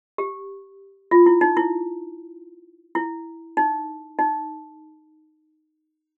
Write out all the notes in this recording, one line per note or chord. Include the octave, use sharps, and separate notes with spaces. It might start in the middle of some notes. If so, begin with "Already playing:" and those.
G4
F4
E4
D#4
E4
E4
D#4
D#4